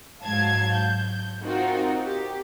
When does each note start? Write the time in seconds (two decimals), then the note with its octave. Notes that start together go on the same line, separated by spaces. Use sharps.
0.23 G#2 F#3 F5 A5 G#6
0.75 G6
1.43 C4 D#4 F4 F#4 A#4
2.05 G4